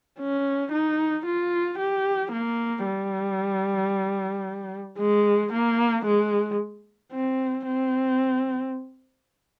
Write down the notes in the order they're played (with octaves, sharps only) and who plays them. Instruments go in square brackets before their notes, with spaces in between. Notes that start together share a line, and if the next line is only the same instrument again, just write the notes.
[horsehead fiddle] C#4
D#4
F4
G4
A#3
G3
G#3
A#3
G#3
C4
C4